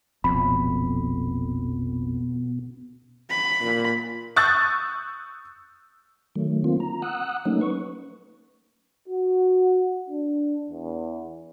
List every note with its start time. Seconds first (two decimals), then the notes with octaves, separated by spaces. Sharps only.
0.24 D1 A#1 F2 B2 B5
3.30 B5
3.61 A#2
4.36 C#6 D#6 E6 F#6 G6 A6
6.36 D#3 F#3 A3
6.64 D#3 A#3 C4 F4
6.80 A#5
7.02 F#5 D#6 E6 F#6
7.45 F#3 A3 A#3 C#4 D#4
7.61 B4 C#6
9.09 F#4
10.09 D4
10.70 E2